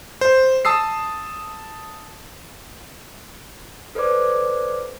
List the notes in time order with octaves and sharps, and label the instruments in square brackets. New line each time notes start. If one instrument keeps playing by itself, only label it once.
[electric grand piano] C5
A5 D#6 E6 C7
[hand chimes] A4 B4 C5 D5 D6